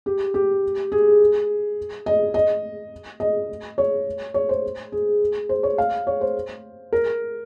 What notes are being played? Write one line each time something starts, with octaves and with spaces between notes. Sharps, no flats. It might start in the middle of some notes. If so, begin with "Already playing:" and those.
G4
G4
G#4
D#5
D#5
D#5
C#5
C#5
C5
G#4
C5
C#5
F5
C#5
C5
A#4